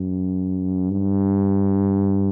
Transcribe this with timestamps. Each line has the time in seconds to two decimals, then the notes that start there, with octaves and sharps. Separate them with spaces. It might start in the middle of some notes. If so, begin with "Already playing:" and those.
Already playing: F#2
0.90 G2